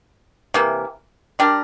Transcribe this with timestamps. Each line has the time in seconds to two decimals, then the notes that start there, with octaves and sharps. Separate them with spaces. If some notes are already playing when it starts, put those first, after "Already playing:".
0.54 C3 E3 A#3
1.39 G3 D4 G4 A#4